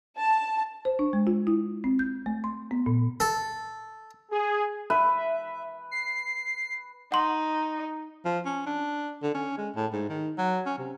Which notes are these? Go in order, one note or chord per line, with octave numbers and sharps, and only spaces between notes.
A5
C5
D4
G#3
F4
E4
C4
G6
A3
C6
B3
A#2
A4
G#4
B4 E5
C7
D#4 F#5 C6
F3
C#4
D4
D3
C#4
G#3
A2
G#2
D#3
F#3
C#4
C3